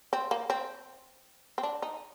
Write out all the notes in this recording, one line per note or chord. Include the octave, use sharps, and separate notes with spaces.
C4
A#3
C4
C4
D4
D#4